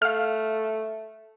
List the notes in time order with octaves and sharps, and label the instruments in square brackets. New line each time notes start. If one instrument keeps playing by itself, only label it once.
[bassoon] A3 [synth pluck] F5 F6